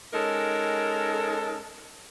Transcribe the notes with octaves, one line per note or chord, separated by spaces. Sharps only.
G#3 C#4 D#4 A4 A#4